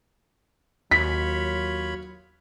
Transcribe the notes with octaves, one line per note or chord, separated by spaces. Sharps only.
D#2 F#3 F4 C#5 B5 B6